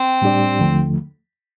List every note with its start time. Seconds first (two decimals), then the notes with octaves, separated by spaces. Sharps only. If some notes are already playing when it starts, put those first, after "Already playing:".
Already playing: C4
0.22 A2 G3 D4 G4 D5
0.59 D#2 D3 F3 A3